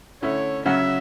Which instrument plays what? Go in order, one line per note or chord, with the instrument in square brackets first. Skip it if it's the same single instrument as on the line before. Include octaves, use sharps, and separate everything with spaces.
[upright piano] D3 A3 C#4 E4 [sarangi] C#5
[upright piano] C#3 F#3 C#4 F#4 [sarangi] E5